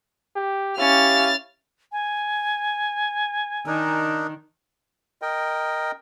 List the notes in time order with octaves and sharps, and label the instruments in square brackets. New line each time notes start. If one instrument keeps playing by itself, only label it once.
[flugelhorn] G4
[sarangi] C#4 [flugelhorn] E4 [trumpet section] G4 F5 [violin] F6 A6
[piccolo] G#5
[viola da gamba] D#3 [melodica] D4 D#4 A#4
[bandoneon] A#4 D#5 G5